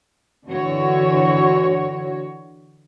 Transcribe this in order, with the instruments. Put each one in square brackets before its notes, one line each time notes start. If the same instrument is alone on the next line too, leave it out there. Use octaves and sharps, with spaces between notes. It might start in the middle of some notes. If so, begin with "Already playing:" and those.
[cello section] D3 E3 F#4 C#5